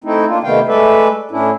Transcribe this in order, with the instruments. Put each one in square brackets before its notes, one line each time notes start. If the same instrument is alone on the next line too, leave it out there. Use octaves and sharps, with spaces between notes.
[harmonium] A3 C4 D#4 E4
A#3 D4 F4
C3 D#3 A3 B3 F5 G5
G#3 A3 A4 B4 D5 E5
A2 C#4 D4 E4